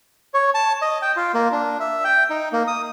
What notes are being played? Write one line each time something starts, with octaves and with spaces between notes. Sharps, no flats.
C#5
A5
D#5
G5
F4
A#3
D4
E5
G5
D#4
A#3
D#6